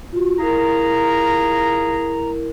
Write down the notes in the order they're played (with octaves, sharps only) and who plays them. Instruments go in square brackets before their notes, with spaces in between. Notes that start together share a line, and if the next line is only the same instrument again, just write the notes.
[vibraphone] F4 F#4
[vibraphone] E4 A#4 [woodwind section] F4 G#4 A#5